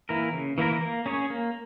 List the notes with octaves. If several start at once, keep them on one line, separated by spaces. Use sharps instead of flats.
E3 A#3 E4 A#4
C#3
E3 A#3 E4 A#4
A#3
C#4 G#4 C#5
A#3